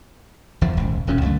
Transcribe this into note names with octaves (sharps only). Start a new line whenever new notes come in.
F#1 E2 F3
D#1 G#1 C#2
E1 F#2 A#2 C#4
C#2 F#2 D3 A3